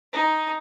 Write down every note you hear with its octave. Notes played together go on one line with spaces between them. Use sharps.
D#4